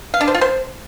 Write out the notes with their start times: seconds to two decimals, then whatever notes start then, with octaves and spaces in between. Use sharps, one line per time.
0.14 F5
0.21 D4
0.28 C5
0.34 F4
0.41 C5